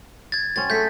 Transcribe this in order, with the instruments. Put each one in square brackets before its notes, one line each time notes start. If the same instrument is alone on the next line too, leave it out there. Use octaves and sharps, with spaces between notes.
[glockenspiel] G#6 A6
[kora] F#3 C4 C#4 [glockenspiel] A6
[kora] A3 G#4 A4 [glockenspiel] G6 B6